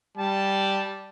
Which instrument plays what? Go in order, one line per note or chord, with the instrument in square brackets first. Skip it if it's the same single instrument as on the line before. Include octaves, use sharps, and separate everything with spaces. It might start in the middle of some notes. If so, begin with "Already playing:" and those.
[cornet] G3 [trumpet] A5